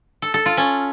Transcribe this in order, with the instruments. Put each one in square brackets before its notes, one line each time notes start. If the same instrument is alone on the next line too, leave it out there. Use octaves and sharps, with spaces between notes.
[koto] A4
A4
F4
C#4